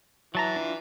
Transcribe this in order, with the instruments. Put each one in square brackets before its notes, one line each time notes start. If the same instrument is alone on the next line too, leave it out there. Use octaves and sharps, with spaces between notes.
[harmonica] E3 [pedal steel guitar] F#3 A5 A#5
[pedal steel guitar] D4 F4